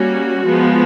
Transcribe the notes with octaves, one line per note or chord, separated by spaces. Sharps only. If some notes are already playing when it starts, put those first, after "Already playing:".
Already playing: G3 A#3 C#4 F#4
F3 G#3 B3